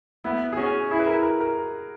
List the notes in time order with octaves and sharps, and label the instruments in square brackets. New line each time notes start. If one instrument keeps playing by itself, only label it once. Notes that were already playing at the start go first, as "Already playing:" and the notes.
[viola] B3 [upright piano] E4
[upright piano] G#4
[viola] C#4 [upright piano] F#4
[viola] E4 [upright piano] G#4
[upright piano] B4
A#4
A#4
A#4